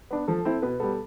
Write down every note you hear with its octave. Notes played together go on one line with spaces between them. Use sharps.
B3 D4
F3 A4
C4 E4
B2 B4
G3 B3 A4